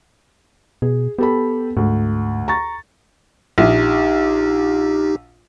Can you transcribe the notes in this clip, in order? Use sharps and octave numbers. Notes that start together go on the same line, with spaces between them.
B2 G#4
B3 G4 A4 B5
D2 G#2
A#5 C#6 A6
A#1 D#4 G4